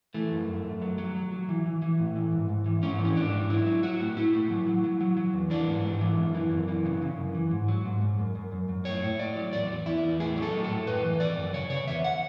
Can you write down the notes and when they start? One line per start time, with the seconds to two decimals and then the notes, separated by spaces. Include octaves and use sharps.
0.14 E3 A3
0.31 F#2
0.48 F#2
0.65 F#2
0.82 F#3
0.98 F#3
1.15 F#3
1.32 F#3
1.49 E3
1.66 E3
1.82 E3
1.99 A2
2.16 E3
2.33 G#2
2.49 G#2
2.66 E3
2.82 G#2 C#4
2.99 E3
3.05 C#4
3.16 G#2 D4
3.33 G#2
3.50 F#3 E4
3.66 F#3
3.83 F#3 F#4
3.99 A2
4.17 A2 E4
4.33 A2
4.50 F#3
4.67 F#3
4.84 F#3
5.01 F#3
5.17 F#3
5.34 E2
5.50 E3 D4
5.67 G#2
5.84 G#2
6.01 E3
6.18 F#2
6.35 E3
6.51 F#2
6.68 E3
6.85 C#3
7.02 C#3
7.18 F#2
7.35 E3
7.51 G#2
7.68 F#3
7.85 G#2
8.02 G#2
8.19 F#2
8.35 F#2
8.52 F#2
8.69 F#2
8.85 A2 C#5
9.03 A2
9.19 A2 D5
9.36 F#3
9.53 E2 D5
9.69 E2
9.86 E2 E4
10.03 E2
10.19 A2 G#4
10.36 F#3
10.42 A4
10.53 A2
10.64 A4
10.70 A2
10.87 F#2 B4
11.04 E3
11.20 E3 D5
11.36 F#2
11.54 C#3 C#5
11.70 C#3 C#5
11.87 E2 E5
12.04 F#5